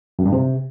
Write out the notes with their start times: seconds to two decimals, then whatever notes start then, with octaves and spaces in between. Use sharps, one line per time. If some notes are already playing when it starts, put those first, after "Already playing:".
0.19 F#2
0.26 G2
0.33 C3